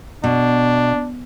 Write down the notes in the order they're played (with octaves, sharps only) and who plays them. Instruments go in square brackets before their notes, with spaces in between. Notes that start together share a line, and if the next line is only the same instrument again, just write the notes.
[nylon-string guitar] B2 [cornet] D4